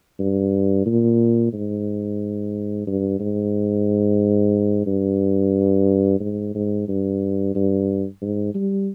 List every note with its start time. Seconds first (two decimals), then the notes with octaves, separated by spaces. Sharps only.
0.20 G2
0.86 A#2
1.53 G#2
2.87 G2
3.20 G#2
4.87 G2
6.20 G#2
6.55 G#2
6.88 G2
7.55 G2
8.22 G#2
8.55 G3